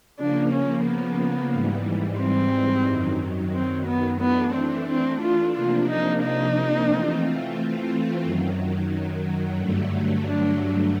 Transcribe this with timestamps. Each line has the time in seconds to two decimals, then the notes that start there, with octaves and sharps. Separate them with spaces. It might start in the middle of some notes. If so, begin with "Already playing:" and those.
0.18 C#3 F3 A#3 D4
0.52 C#4
0.85 B3
1.53 G#2 E3 G3
2.19 C4
2.87 F#2 D#3 F#3
3.54 C4
3.87 B3
4.20 E3 A3 B3 D4
4.55 C4
4.88 C4
5.22 F4
5.55 C3 F3 A#3 D4 F4
5.89 D#4
6.23 D#4
6.89 E3 A3 C4 F4
8.24 F#2 D#3 F#3
9.58 G2 D3 F#3 A3
10.25 D4